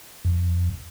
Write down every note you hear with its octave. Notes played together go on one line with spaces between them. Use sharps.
F2